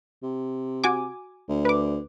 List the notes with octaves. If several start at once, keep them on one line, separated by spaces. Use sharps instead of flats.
C3
F#4 G#5 D6
D2
B4 D6